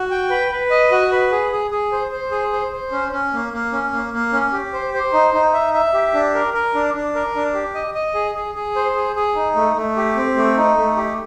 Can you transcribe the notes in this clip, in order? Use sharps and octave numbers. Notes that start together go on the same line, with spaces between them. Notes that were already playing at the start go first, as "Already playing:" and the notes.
Already playing: F#4
G5
B4
B4
D#5
F#4
B4
G#4
G#4
G#4
C5
C5
G#4
C5
C5
C#4
C#4
A#3
A#3
C#4
A#3
A#3
C#4
G4
C5
C5
D#4
D#4
E5
E5
G4
D4
A#4
A#4
D4
D4
A#4
D4
G4
D#5
D#5
G#4
G#4
G#4
C5
G#4
G#4
D#4
A3
A3
G4
C4
A3
D#4
A3
G4